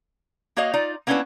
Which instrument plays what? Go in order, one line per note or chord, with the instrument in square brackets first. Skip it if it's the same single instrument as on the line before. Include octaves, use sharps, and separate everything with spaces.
[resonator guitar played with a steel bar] A#3 F#4 C#5 D#5 F5
D#4 F4 D5
A#3 B3 C#4 D4 E4 B4